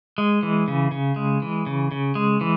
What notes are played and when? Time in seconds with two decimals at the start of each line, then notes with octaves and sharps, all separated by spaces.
0.18 G#3
0.43 E3
0.68 C#3
0.92 C#3
1.16 G#3
1.42 E3
1.66 C#3
1.92 C#3
2.15 G#3
2.41 E3